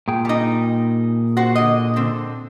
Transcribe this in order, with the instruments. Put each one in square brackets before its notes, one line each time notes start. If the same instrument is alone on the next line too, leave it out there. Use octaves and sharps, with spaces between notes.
[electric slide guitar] A#2 G#4 G5
[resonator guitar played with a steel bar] G3 D#4
F#4 C5
D3 D#5
D3 C4